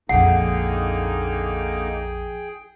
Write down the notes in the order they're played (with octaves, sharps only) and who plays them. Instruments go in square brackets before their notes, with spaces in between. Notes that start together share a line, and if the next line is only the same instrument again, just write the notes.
[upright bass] A#1 F2 [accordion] D3 A#3 D#4 [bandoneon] G#4 G5 [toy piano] F#5